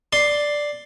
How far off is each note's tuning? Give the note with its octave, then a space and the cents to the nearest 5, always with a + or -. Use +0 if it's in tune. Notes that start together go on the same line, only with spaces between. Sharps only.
D5 +0 C6 +0